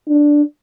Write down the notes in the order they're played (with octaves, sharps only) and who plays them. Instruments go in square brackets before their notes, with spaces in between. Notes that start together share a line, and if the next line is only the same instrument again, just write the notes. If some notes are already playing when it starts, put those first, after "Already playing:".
[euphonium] D4